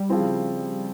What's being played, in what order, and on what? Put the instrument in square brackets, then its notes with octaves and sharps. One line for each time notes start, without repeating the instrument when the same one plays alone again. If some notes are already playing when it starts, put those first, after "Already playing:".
Already playing: [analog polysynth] G3
[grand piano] C#3 F3 C4 E4